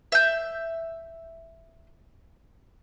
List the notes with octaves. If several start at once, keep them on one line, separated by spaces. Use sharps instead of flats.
E5 G6